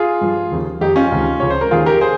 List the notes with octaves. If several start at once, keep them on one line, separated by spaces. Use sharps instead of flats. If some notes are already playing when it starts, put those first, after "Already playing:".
Already playing: F4 G#4
G2 F3
D#2 C#3 F3
F2 D#3 D#4 G4
C#4 F4
C#2 C3 D#3
C#2 C#3 F3 C#5
C5
A#4
D#2 D#3 F4 G#4
G4 A#4
G#4 C5